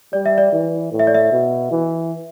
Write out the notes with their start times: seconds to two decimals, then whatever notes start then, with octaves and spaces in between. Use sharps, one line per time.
0.13 G3 D5
0.26 E5
0.38 D5
0.52 E3
0.92 A2
0.99 E5
1.07 D5
1.14 E5
1.32 B2
1.71 E3